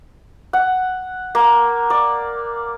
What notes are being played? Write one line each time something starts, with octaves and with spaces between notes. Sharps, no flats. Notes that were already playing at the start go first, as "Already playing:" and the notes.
F#5
A#3
D5